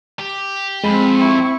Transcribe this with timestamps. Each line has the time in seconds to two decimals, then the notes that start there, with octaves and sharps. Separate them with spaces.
0.19 G4
0.84 F2 G#3 C4 B5
1.18 E4 C#6